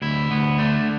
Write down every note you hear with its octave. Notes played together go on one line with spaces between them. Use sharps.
D2 E4
D2 B3
D3 A3